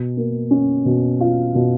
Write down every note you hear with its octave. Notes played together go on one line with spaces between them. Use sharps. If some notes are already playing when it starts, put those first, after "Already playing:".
Already playing: B2
A#3
C#4
B2
F4
B2